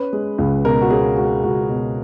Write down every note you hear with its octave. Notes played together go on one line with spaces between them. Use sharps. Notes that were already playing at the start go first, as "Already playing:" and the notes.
Already playing: C#4 B4
G#3
C#2
B2 A#4
F#4
C#4 G#4
G#3 F#4
C#2 F#4
B2